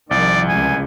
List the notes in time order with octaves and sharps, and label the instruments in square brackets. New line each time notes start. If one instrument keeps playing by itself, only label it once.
[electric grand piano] C2 [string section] D#3 F3 [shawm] D5
[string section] C#2 [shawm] G#5